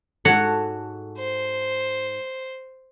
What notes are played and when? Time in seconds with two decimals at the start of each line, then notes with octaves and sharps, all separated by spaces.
0.25 G#2 F#4 A4 C#5 F#5
1.18 C5